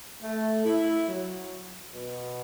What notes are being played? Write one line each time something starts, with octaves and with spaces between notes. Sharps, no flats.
A3
E4
F#3
B2